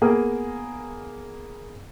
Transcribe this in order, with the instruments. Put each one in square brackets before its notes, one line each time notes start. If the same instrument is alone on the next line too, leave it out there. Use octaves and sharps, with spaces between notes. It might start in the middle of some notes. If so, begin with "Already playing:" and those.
[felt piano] A#3 B3 G#4 A#4